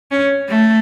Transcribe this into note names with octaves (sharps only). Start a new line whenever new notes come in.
C#4
A3